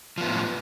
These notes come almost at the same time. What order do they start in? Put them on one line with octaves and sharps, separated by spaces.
F3 B3 A2